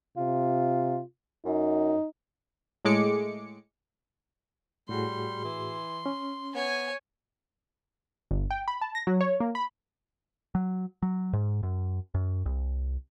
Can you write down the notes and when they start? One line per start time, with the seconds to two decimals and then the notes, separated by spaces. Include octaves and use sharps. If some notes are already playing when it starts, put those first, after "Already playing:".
0.17 C3 F4
1.45 F#2 D#4
2.85 A2 G#3 D6 C#7
4.89 A2 G3 F#4 G#4 C6
5.44 E3
6.06 C#4
6.55 B3 C#5 G#5
8.31 G1
8.51 G5
8.68 B5
8.81 A5
8.95 A#6
9.07 F#3
9.21 C#5
9.40 A#3
9.55 B5
10.55 F#3
11.02 F#3
11.33 G#2
11.63 F#2
12.14 F#2
12.46 C2